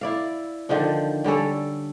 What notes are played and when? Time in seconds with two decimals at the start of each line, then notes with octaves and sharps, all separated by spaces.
0.01 E4 D5 F5
0.69 D3 D#3 F3 D4
1.24 D3 G3 C#4 A4